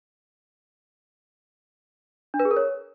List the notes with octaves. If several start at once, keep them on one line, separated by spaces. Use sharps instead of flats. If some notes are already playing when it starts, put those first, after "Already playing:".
D4
B4
G#4
A#4
C#5